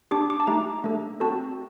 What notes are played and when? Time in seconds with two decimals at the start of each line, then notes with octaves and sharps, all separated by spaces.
0.11 D4 G4 D6
0.30 D6
0.40 A5
0.47 A3 D#4 G4 A#5
0.84 A3 D4 A4
1.20 C4 F#4 A4 A5